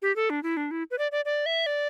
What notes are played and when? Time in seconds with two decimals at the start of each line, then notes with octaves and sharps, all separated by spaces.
0.02 G4
0.16 A4
0.30 D4
0.43 E4
0.57 D4
0.71 E4
0.91 B4
0.98 D5
1.12 D5
1.25 D5
1.46 E5
1.66 D5